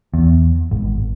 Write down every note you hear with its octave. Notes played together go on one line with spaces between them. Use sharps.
E2
G#1